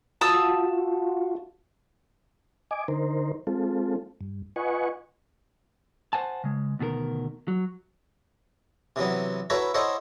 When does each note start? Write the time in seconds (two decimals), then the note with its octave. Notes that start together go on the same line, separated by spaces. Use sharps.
0.21 F4 F#4 A5 D#6 E6
2.71 D#5 G#5 D6
2.88 D3 D#4 A#4 C5
3.47 G#3 C4 F4 A4
4.21 G2
4.56 F4 B4 D#5 F#5 G#5 C#6
6.13 C5 F#5 G#5 A5
6.44 C#3 G#3
6.79 D2 B2 D#3 G#4 A#4
7.48 F#3
8.96 C3 E3 F#3 B3
9.50 E4 F#4 A4 B4 C#5 A#5
9.74 E4 A4 C5 C#5 D#5 F#5